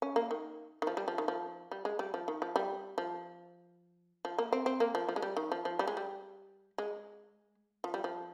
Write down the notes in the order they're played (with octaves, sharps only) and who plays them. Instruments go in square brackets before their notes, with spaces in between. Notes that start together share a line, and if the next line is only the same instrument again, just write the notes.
[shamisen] C#4
A#3
D#3
D#3
F3
G3
F3
D#3
F3
G3
G#3
G3
F3
D#3
F3
G3
F3
F3
A#3
C4
C4
A#3
F3
F3
G#3
G3
D#3
F3
F3
G3
G#3
G3
G#3
F3
G3
F3